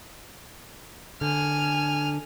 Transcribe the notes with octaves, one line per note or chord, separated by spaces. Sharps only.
D3 G#5 F6